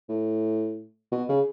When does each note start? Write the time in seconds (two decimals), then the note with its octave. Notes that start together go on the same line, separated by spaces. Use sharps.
0.09 A2
1.12 B2
1.29 C#3